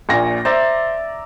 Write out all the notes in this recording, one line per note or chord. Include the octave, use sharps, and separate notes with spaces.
A#1 A#2 A#6
C5 D5 E5 A#5